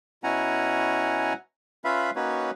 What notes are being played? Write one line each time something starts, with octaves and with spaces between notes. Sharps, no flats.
B2 C#4 E4 F#5 G#5 A#5
C#4 F4 B4 E5 F5 B5
A#3 C#4 D#4 F#4 B4 C#5